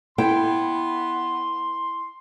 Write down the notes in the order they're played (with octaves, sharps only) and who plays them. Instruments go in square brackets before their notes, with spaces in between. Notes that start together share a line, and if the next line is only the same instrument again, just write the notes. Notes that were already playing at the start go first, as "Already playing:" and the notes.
[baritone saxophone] B3 [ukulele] E4 [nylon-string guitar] G5 [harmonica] C6